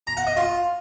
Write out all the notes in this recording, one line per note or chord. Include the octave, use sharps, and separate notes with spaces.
A#5
F#5
D#5
F4